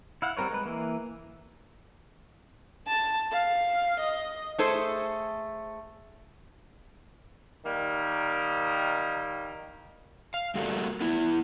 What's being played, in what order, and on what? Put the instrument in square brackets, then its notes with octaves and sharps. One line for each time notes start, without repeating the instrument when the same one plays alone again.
[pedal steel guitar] E4 F5 F#5
G3 C4 A#4 B4 C#5
G#3 B4
E3 A#3
[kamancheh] A5
F5
D#5
[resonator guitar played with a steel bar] A3 G#4 A4 C5
[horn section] D#3 G3 A#3
[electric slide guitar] F5
G3 A3 A#3 F#4 A4 D5
B3 E4